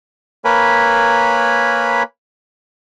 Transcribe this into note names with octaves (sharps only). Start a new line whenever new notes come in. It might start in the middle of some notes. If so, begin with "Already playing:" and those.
A#3 A#4 B4 C#5 G#5 B5